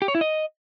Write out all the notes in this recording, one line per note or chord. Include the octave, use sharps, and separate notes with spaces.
G4
C#5
E4
D#5